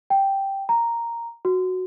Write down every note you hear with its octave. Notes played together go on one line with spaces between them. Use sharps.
G5
A#5
F#4